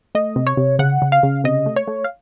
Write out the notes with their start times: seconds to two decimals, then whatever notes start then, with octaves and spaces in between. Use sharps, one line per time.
0.15 A3 D#5
0.36 C3
0.47 C#5
0.57 C3
0.79 C#3 F#5
1.02 C#3
1.12 F5
1.23 C#3
1.44 C3 D#5
1.66 A3
1.76 C#5
1.87 A3
2.04 F5